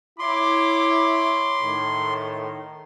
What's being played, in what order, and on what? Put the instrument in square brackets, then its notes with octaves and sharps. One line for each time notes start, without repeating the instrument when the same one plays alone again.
[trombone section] E4 [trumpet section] C#5 B5 D6 [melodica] C6
[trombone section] A2 D#3